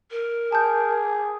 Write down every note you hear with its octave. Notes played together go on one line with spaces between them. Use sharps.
A#4
G#4 A5 G6